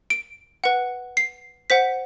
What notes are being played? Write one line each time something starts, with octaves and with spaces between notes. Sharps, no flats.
D7
B4 F#5
C7
C5 F#5 B6